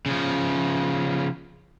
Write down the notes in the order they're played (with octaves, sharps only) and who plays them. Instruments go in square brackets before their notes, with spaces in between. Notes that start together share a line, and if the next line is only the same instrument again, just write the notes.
[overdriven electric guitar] C#3 F3